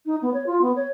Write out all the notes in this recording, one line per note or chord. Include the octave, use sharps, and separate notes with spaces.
D#4
B3
C#5
F4
B3
C#5